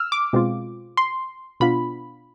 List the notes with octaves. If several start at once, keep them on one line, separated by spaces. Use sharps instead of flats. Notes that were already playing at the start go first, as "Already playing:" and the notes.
Already playing: E6 F6
D6
B2 G#3 C4 F4
C6
B2 B3 D4 F4 B5